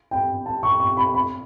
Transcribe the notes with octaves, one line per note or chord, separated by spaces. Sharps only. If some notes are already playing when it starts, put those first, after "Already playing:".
G5
A5
C#6
C#6
B5
B5